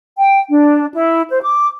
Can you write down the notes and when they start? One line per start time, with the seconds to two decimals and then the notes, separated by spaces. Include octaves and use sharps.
0.17 G5
0.50 D4
0.94 E4
1.29 C5
1.42 D6